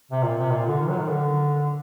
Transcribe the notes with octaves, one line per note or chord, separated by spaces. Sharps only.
C3
A#2
C3
A#2
D3
D#3
F#3
D#3
D3